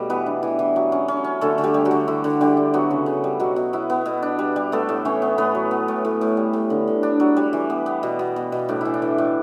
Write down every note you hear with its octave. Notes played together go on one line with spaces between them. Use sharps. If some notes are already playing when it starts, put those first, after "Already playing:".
Already playing: B2 G3 A3 A4
E3 B3 B4
D4
E3
E3
F#3
C#4
C#4
C#4
D3 A3 A4
D3
G3 G4
G3
F#3 F#4
D3
D3 E4
D3
D3 G3 G4
D4
F#3 B3 F#4
C#3
C#3
G3
B2 F#3 F#4
B2
B3 E4
B3
B2
D4
G3
G3
A3 B3 A4
A2
E3 C#4 C#5
B3
A2 B3 B4
F#3
B3
A2
A2
A2
G3
A2
D3
D3
D4
F#3
G3
E3
B3
B3
B2
B2
B2
B2
A2 D4
E3 E4
D4
E3
A2